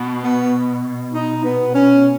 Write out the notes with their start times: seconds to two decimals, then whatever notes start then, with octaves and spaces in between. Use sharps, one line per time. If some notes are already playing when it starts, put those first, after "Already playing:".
Already playing: B2
0.23 B3
1.13 D#4
1.44 B3
1.74 C#4